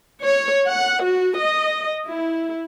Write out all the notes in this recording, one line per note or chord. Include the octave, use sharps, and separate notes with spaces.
C#5
F#5
F#4
D#5
E4